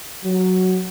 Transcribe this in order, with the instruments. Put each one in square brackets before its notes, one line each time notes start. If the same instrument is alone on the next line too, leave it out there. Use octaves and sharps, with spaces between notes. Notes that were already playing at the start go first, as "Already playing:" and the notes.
[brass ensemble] F#3